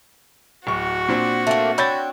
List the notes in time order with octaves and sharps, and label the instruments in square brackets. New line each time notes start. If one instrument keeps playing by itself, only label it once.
[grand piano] D1 C#6 [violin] F#4
[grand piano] A#2 C4 D4
[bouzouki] A3 A#3
[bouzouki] C4 D4 C#5 [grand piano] B5 G6 A6